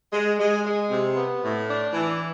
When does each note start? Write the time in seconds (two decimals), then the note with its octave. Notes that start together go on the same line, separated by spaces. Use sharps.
0.12 G#3
0.38 G#3
0.65 G#3
0.90 C3
1.16 B3
1.42 A2
1.68 D4
1.93 E3